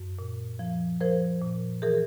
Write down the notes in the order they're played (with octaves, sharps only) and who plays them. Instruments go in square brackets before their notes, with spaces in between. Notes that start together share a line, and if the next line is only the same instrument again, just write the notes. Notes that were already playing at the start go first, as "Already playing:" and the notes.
Already playing: [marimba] F#2
A#2
F3
F3 A#4 C5
A#2
E3 G#4 A#4